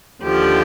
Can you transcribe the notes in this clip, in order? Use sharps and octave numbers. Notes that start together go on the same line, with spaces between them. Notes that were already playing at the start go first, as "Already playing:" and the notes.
D#2 D3 F3 G4